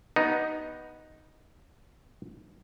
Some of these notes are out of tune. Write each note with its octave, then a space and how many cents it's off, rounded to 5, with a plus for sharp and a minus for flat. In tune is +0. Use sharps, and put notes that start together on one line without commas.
B3 -10 D#4 +0 G4 -35